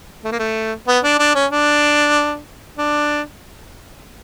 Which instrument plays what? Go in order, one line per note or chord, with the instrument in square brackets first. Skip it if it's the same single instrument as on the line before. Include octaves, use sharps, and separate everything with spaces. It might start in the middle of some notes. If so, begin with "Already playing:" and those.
[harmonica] A3
A#3
A3
B3
D4
D4
C#4
D4
D4